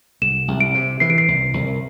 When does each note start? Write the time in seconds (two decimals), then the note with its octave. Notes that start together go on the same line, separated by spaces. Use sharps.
0.22 C2 E7
0.48 C2
0.60 D7
0.74 C3
1.00 E3 C7
1.10 D7
1.18 C7
1.28 C2
1.53 C2